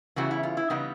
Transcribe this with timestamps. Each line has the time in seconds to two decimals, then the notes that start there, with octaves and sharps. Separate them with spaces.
0.16 C#3 E3 G3 B3 F#4
0.31 E4
0.43 F4
0.57 E4
0.70 C#3 E3 G3 B3 D#4